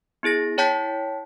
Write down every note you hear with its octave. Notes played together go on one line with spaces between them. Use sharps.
B3 E4 G#4 A#6
E4 C#5 G5 A5 G6 B6